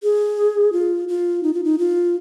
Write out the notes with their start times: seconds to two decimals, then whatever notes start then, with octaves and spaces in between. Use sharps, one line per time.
0.03 G#4
0.72 F4
1.08 F4
1.43 D#4
1.54 F4
1.64 D#4
1.79 F4